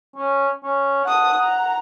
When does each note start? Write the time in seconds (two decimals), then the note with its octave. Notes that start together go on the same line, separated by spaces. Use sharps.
0.16 C#4
0.63 C#4
1.05 F#5 A5 D#6
1.40 A#5